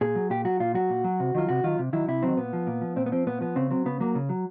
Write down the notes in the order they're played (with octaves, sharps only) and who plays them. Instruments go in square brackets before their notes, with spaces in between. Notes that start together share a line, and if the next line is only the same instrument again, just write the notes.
[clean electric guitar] A#2 G#4
F#3
A#2 G4
F#3 F#4
A#2 F4
F#3 F#4
A#2
F#3
C3
D#3 F#3 F4
C3 F#4
D#3 F#3 F4
C3
D#3 F#3 E4
C3 E4
D#3 F#3 C4
A#2 B3
F3
A#2
F3
A#2 C4
B3
F3 C4
A#2 B3
F3 B3
C#3 C4
F#3 C4
C#3 B3
F#3 A#3
C#3
F#3